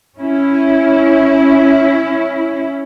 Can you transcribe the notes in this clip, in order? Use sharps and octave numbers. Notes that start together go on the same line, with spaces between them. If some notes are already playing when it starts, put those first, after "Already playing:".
C#4 E4